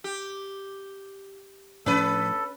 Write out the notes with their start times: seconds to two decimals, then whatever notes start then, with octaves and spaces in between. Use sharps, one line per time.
0.04 G4
1.86 A2 F3 C#4 A4 B4